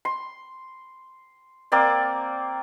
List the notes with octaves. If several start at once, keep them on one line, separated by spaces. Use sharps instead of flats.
C6
A#3 C4 D5